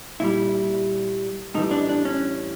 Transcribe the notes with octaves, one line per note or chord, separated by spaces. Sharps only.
A#2 G3 E4
A2 E3 G3 D#4
D4
D4
C#4